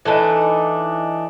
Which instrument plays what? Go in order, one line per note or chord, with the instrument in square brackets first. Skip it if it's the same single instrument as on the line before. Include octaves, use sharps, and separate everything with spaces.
[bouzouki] E3 A3 D4 D#4